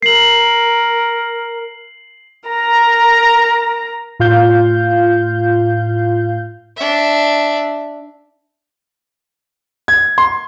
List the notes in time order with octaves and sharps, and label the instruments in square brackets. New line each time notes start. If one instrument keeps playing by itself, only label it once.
[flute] A#4 [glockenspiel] C7 F#7
[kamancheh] A#4 A#5
[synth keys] A2 F4 F5 G6
[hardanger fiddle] D4 E5
[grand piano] G#6
C6